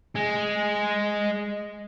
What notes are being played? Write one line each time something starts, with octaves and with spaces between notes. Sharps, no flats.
G#3